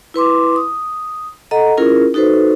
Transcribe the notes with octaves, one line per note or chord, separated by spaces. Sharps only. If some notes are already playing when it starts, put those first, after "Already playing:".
E4 B4 C6 D6
D#6
A4 D#5 F#5 A#5
C#4 E4 F4 G#4 A#4
D#4 F#4 A4 B4 C5